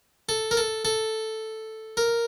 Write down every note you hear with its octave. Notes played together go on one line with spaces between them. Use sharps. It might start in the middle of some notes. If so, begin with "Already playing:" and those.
A4
A#4
A4
A4
A#4